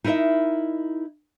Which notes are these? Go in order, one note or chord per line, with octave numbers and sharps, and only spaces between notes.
D#4 E4 A#4 B4 D#5 E5